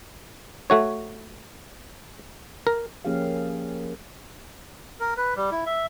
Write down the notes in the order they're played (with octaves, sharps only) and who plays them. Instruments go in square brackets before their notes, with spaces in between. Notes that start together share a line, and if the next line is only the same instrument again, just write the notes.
[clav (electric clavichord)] A3 F#4 C#5
A#4
[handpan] F3 A#3 C#4 G4 G#4 F5
[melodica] A#4
B4
G3
E4
E5